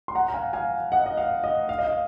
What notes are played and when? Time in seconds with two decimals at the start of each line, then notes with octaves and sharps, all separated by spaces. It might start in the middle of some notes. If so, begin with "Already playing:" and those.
0.08 C6
0.15 F#5 A#5
0.28 A#5
0.34 F5 G#5
0.53 F5 G#5
0.92 D#5 F#5
1.06 D#5
1.17 F5
1.44 D#5
1.69 F5
1.79 D#5
1.87 F5